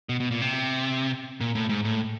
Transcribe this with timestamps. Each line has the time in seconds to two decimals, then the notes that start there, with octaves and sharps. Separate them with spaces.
0.09 B2
0.20 B2
0.31 A#2
0.41 C3
1.41 A#2
1.55 A2
1.69 G#2
1.85 A2